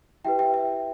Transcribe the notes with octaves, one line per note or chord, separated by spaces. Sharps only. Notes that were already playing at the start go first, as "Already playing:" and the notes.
E4 G4 B4 E5 G5
E5 G5
E5